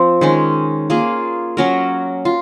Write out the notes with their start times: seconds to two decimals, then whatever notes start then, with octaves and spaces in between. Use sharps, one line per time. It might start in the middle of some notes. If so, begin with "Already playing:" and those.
Already playing: F3 C4
0.21 D#3 G#3 C#4
0.90 A#3 F4 G#4
1.57 F#3 C#4 F#4 A#4
2.25 F4